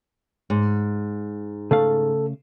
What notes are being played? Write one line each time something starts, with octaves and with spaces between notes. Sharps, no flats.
G#2
C#3 A3 A4 F5